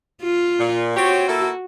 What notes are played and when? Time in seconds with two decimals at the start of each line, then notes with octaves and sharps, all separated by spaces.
0.22 F4
0.60 A#2
0.96 C4 F#4 G4 C#5
1.29 A#3 E4 A4